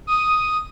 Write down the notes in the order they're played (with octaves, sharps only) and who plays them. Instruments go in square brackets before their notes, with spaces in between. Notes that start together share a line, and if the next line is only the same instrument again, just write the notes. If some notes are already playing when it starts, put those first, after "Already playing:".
[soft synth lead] D#6